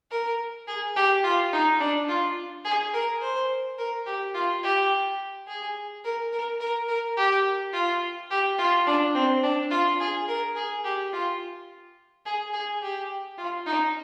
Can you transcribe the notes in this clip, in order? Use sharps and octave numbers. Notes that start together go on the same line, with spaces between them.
A#4
G#4
G4
F4
D#4
D4
F4
G#4
A#4
C5
A#4
G4
F4
G4
G#4
A#4
A#4
A#4
A#4
G4
F4
G4
F4
D4
C4
D4
F4
G#4
A#4
G#4
G4
F4
G#4
G#4
G4
F4
D#4